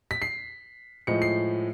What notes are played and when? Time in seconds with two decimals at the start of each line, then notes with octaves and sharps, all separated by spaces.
0.11 B6
0.22 C7
1.07 A2 F3 G#3 C#7
1.22 C7